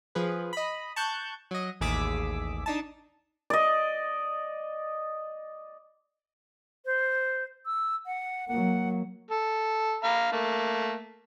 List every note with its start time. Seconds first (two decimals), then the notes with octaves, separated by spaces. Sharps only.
0.15 F3 G#4 B4
0.53 D#5 B5
0.96 A5 C#6 F#6 G6
1.51 F#3 D#5
1.81 A1 D#2 G#4 D6 E6 B6
2.66 D4 D#4 A5
3.50 D5 D#5
6.85 C5
7.66 E6
8.06 F#5
8.48 F#3 A#3 F#5
9.30 A4
10.03 F5 A#5 B5
10.32 A3 A#3